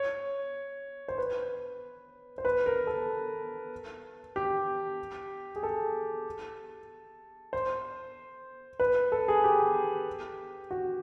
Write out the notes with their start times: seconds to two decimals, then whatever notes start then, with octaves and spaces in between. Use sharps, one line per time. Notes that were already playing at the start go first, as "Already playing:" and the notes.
Already playing: C#5
1.08 C5
1.18 B4
2.38 C5
2.45 B4
2.66 A#4
2.87 A4
4.36 G4
5.56 G#4
5.63 A4
7.53 C5
8.80 B4
9.12 A4
9.28 G#4
9.44 G4
10.71 F#4